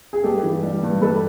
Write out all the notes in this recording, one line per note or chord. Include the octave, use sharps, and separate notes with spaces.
G#4
G2 G4 A4
E3
G3
G2
G2 A4 B4